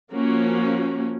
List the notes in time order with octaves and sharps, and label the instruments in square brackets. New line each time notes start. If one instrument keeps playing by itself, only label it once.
[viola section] F3 A#3 C#4 F#4